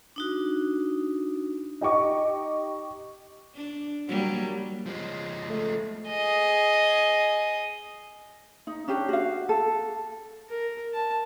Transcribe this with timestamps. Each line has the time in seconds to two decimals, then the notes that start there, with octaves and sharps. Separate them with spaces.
0.16 D4 D#4 F#4
1.81 D#4 G4 D#5 C#6 D6
3.55 D4
4.08 F#3 G3 A#3
4.86 F3 G#3
5.49 A3
6.09 G#4 D#5
8.67 D#4
8.88 C#4 D4 G4
9.09 F#4 F5
9.49 A4
10.50 A#4
10.94 A5